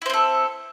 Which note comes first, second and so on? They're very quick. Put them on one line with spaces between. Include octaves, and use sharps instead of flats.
E4 C5 C4 A4